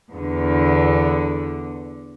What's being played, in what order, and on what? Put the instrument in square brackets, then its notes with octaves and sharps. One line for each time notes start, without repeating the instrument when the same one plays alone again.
[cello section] E2 D3